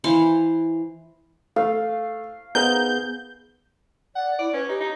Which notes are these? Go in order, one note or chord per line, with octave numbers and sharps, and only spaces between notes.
E3 C5 F5
A3 F5
B3 D#4 G#4 A#4 C5 G6
D5 F#5
E4 D5
C#4 B4
D#4 G4
D#4